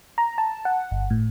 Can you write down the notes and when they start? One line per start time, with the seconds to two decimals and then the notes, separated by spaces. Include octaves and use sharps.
0.18 A#5
0.38 A5
0.65 F#5
0.91 G1
1.10 A2